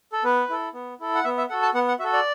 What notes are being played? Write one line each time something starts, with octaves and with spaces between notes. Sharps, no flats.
A4
B3 B4
E4 A4
B3
E4 A4
F#5
B3 E5
E5
F#4 A4 F#5
A5
B3 F#5
F#5
F#4 A4 E5
D5